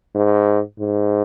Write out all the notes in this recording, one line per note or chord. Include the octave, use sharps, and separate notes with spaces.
G#2
G#2